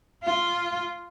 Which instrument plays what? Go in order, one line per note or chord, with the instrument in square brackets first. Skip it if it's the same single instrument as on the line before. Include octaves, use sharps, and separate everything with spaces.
[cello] F4